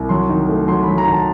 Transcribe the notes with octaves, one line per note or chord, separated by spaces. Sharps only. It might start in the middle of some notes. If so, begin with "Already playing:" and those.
Already playing: C2
F#3 C6
D#3
A3
F#3 C6
B5
F#3
A#5
D#3
A5